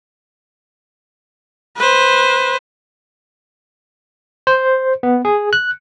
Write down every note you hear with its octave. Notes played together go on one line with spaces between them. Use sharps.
B4 C5
C5
B3
G#4
F#6